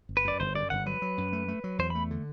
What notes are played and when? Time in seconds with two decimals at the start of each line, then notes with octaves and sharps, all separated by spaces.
0.09 G1
0.17 B4
0.25 F#2 D5
0.40 G1 C5
0.55 F#2 D5
0.70 G1 F#5
0.86 F#3 B4
1.02 F#3
1.18 F#2
1.33 A3
1.48 A3
1.64 F#3
1.78 E2 C5
1.90 A3 B5
2.11 D3